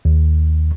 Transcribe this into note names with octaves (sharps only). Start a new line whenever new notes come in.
D#2